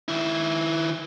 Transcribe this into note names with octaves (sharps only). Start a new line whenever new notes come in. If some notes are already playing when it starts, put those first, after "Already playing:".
D#3 E4